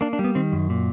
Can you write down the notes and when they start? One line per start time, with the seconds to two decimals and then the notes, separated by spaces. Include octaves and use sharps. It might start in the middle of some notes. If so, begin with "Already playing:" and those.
0.01 A#3 D4
0.13 D4
0.19 G3
0.24 B3
0.35 D#3 C4
0.52 F#2
0.70 A#2